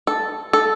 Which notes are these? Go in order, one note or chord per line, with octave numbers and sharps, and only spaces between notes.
A4
A4